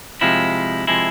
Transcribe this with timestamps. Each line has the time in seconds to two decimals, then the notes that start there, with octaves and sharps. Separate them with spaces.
0.21 C3 F3 G#3 E4
0.87 C3 F3 G#3 E4